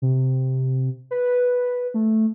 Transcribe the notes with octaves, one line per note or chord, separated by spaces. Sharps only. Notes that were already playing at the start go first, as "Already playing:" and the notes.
C3
B4
A3